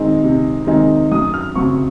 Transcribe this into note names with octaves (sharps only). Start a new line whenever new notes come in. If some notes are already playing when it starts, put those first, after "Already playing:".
Already playing: D#3 G#3 C4 D#4
C3
D#3 G#3 C4 D#4
F#2 D#6
F6
C#3 F#3 C4 C#6